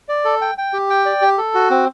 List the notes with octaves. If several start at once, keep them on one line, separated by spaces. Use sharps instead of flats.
D5
A4
G5
G5
G4
G5
D5
G4
A4
F#4
C4